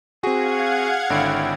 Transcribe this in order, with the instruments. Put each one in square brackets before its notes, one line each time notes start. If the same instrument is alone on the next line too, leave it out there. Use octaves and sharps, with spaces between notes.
[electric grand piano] C4 F#4 [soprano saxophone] G#4 [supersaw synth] F5 F#5 G#6
[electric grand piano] G#1 D3 D7 [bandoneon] E4 C#5 G5